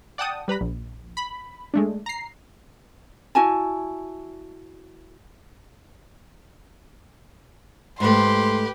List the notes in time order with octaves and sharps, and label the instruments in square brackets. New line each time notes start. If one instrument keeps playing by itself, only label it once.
[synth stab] D5 F#5 G5 A5 D#6
G3 B4 A#5 B5
A#1
B5
G#3 A3 D4
A#5 C7
[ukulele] E4 F#4 G#5 A5
[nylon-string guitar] G#2 A3 [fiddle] G4 B4 [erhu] C6